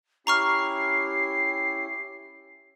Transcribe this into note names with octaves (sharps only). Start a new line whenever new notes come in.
C#4 E4 G4 A#5 C#6 F6 C7